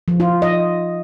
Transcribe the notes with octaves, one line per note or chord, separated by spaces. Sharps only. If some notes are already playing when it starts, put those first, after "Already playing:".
F3
F4
D#5